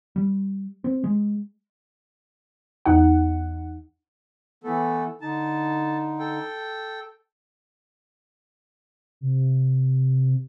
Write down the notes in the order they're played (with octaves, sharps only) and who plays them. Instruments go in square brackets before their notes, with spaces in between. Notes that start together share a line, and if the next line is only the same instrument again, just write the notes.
[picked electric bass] G3
C4
G#3
[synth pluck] E2 D#4 F#5
[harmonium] E3 B3 [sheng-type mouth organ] A3 A4
[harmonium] D3 D#4 [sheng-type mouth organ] A5
[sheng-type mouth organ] A4 G5
[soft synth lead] C3